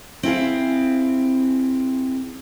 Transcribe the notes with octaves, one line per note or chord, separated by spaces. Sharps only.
C4 E4 G#4 F5